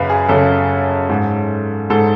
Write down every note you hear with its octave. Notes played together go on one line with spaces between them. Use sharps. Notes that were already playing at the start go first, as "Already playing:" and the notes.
Already playing: F#2 C#3 B4 F5
G#4
F#2 C#3 A4
G#2
G#2 A4